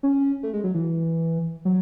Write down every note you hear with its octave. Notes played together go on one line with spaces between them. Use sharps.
C#4
A3
G#3
F#3
E3
F#3